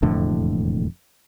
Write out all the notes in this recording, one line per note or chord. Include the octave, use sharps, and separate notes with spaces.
E1 F2 A2 D3